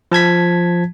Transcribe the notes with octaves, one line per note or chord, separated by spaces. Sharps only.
F3 A5 G#6 B6